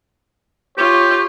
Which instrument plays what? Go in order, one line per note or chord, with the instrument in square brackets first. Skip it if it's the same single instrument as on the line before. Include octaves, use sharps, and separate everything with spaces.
[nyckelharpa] F4 [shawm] G4 [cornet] C#5